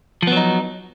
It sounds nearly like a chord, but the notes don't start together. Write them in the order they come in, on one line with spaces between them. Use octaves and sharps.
F3 B3 F#3 D#4